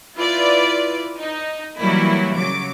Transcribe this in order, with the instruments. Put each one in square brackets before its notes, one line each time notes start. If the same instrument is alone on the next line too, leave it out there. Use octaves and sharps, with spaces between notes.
[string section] E4 F4 B4 D5
D#4
E3 F#3 G3 A#3 E4
C#3 F#3 D6